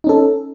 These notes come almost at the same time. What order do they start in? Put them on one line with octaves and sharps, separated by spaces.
D#4 C#4 A4